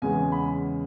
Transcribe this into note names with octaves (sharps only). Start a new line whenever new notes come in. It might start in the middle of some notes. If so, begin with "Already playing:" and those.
E2 C#3 G#3 B3 G#5
B5